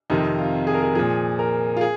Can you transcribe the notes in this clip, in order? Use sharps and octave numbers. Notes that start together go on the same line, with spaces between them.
F2 C3 D#3 D#4
F4
G#4
A#4
G#4
A#2 F3 G#4
A#4
F4
G#4